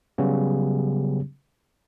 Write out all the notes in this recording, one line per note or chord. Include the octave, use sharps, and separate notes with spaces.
C#3 F#3 G3 B3 C#4 G4